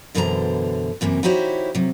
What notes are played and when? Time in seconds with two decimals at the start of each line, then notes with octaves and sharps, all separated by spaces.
0.15 F#2 B2 D3 E3 C5 A#5
1.01 F#2 C3 E3 A#3
1.23 D#4 E4 F#4 G4 C5 C#5
1.75 C3 F#3